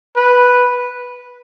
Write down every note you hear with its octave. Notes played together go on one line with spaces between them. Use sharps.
B4